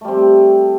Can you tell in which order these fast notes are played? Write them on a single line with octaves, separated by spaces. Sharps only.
A3 G3 C4